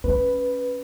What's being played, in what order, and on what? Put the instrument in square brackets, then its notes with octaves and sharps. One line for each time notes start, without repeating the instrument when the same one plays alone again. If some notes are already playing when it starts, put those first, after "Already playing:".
[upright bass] C#4 [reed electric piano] B4